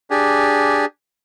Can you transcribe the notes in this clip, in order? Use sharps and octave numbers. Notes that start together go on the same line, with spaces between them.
D4 G4 G#4